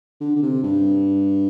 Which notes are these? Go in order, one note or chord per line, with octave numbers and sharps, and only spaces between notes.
D3
D3
C3
G2